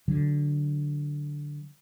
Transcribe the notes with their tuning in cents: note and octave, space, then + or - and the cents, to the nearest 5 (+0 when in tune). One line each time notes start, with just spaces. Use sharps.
D3 +0 F#3 +0